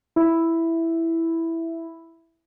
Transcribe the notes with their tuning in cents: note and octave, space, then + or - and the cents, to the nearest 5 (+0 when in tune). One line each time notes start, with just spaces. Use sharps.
E4 +0